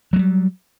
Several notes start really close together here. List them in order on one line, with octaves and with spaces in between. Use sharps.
F#3 A3 G3